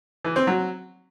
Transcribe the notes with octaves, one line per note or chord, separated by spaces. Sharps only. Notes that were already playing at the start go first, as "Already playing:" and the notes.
E3
C4
F#3